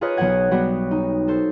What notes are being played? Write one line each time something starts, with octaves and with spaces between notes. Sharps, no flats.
F4 G#4 A#4 B4 C#5 D#5
B1 F#3 B3 G#4 F#5 G#6
F#3 G3 B3 F#4
D#4
A4 C5